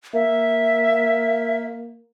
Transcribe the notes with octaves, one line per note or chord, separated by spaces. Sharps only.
A#3 E5